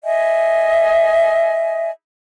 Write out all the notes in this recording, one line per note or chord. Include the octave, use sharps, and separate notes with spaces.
D#5 E5 G#5